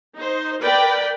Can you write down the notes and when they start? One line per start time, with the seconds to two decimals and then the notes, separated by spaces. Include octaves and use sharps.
0.15 D#4 C5
0.61 A#4 B4 D5 G5 B5